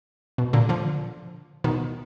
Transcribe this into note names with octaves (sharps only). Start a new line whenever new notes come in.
B2
A#2 D3
D3 F3
B2 D#3